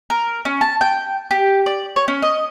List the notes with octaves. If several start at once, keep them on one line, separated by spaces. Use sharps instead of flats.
A#4
C#4
A5
G5
G4
D5
C#5
C#4
D#5